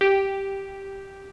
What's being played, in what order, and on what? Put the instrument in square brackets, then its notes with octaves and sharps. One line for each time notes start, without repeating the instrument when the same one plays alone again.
[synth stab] G4